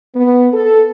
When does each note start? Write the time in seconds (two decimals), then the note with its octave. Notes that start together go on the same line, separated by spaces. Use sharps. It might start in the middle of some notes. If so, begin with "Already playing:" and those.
0.16 B3
0.54 A4